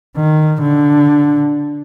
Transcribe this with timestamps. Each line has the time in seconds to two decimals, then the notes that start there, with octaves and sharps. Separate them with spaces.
0.17 D#3
0.61 D3